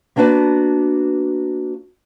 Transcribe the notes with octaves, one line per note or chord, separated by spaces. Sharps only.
A#3 B3 D4 F#4 B4 A5